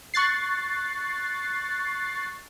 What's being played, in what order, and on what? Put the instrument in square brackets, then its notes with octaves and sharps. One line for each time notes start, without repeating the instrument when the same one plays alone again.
[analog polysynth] C#6 F#6 A6 C7